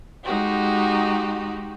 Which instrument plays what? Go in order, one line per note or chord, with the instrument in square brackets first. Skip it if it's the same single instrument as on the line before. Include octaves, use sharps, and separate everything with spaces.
[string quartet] G#3 D#4 F#4 G4